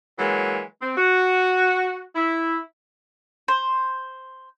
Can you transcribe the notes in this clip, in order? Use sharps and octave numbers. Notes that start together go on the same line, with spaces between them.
E3 F#3 G#3 A#3
C4
F#4
E4
C5